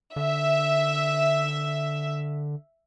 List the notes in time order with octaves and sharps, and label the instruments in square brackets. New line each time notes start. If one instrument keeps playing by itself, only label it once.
[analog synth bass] D3 [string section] E5